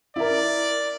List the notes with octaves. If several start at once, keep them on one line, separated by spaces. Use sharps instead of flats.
E4 A#4 D5